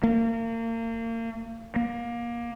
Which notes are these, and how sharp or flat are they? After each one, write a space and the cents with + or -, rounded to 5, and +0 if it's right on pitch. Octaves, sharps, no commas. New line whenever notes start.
A#3 -35
A#3 +25